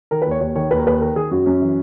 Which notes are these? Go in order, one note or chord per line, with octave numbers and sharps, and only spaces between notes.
D#3 A#4
B4
D#2 C#5
D#2 C#5
D#3 C#5
D#2 B4
A#4
D#2 B4
D#3 A#4
D#3 G#4
F#2 F#4
F#2 C#4
E3